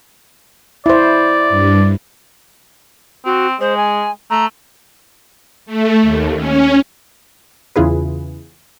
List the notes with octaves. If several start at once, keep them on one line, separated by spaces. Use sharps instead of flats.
E4 C5 D5
G2
C4 F#4
G#3 C5
G#5
A3 A#5
A3
D#2
C#4
E2 C#3 E4 F4 G#4 B4